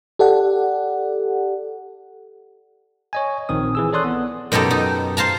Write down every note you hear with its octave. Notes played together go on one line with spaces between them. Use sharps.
G4 A4 D5 F#5
C#5 D#5 G#5
A#1 D#3 C4 D#6
E3 G#4 E6
A4 C#5 D5 C6 D#6 F#6
B3
F#2 B2 D#4 G4 A4
D#4
C5 F5 A5 A#5